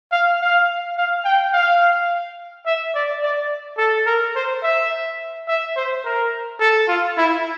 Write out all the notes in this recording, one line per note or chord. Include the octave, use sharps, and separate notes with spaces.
F5
F5
F5
G5
F5
E5
D5
D5
A4
A#4
C5
E5
E5
C5
A#4
A4
F4
E4